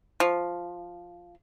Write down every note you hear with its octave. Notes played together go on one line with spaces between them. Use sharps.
F3